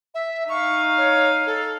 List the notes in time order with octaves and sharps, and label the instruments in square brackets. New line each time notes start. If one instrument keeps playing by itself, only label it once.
[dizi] E5
[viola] D#4 F5 [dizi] C#6
[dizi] C#5
A4